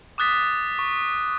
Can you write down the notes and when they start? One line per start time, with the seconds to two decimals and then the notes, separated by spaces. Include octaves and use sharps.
0.18 D6 D#6 F#6 A6 B6
0.79 C#6